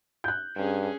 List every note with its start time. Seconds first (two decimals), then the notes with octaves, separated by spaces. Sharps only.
0.24 F#6 G6
0.56 G2 C#4 G#4